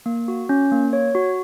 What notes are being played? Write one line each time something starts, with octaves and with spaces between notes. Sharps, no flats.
A#3
F#4
C#4
A#3
C#5
F#4